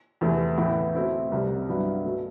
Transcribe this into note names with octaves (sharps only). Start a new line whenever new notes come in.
E2 C3 E3 A3 C4
A2 E3 B3 E4
B2 A3 C4 E4
C2 C3 G3
G2 F#3 B3 E4
B2 A3